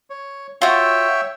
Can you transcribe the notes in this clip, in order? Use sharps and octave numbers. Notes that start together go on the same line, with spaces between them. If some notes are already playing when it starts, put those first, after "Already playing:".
C#5
F4 F#4 C#5 E5 G5